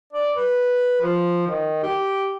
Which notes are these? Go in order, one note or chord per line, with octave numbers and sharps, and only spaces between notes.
D5
B4
F3
D#3
G4